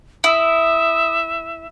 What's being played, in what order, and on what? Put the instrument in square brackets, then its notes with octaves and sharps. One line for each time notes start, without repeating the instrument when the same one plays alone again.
[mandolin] E4 [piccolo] E5 [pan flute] D#6